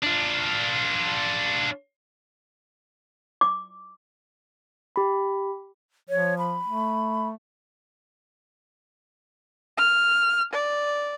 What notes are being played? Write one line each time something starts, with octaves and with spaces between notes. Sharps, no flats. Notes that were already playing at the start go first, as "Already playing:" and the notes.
D4 F4
D6
G4 B5
F3 C#5
B5
A3
F6
D5